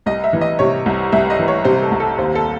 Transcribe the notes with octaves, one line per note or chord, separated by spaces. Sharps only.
C2 D#5
E5
E3
D#5
C3 C#5
C2
C2 E5
D#5
E3
C#5
C3 C5
A4
C2
A4
D#2 C5
A4